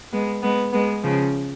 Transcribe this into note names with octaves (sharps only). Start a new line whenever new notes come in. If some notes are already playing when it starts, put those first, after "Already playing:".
G#3 B3
G#3 B3
G#3 B3
C#3 F3